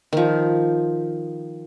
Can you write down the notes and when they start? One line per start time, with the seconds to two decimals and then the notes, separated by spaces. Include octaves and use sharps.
0.13 D#3 F3